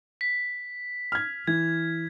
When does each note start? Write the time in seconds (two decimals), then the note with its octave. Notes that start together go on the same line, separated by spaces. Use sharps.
0.21 B6
1.12 F6 G#6
1.47 E3 G#6